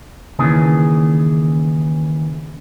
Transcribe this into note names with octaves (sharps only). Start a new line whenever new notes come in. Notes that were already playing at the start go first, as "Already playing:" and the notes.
D#2 C#3 E3 G#4